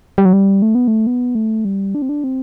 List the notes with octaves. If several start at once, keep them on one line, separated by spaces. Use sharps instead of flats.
G3
F#3
G3
A3
B3
A3
B3
A3
G3
D4
C4
D4
C4